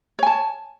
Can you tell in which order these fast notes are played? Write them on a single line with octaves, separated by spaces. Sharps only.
C#5 G#5 A5